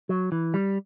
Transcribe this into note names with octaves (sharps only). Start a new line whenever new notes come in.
F#3
E3
G3